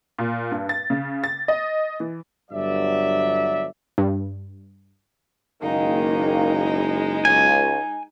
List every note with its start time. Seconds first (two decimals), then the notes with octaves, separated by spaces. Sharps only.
0.19 A#2
0.51 G2
0.69 A6
0.90 C#3
1.24 A6
1.48 D#5
2.00 E3
2.51 G1 G2 F#3 D5 E5
3.98 G2
5.62 F#1 D#3 G#3 A#3 D#4
7.25 C#2 G#5